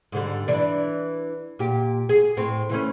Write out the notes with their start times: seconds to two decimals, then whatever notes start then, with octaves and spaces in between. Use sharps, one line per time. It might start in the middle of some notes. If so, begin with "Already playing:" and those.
0.12 G#2 D3 G3
0.48 E3 D4
1.59 A#2 G4
2.09 G#4
2.37 A2 C4
2.70 E3 A3 C#4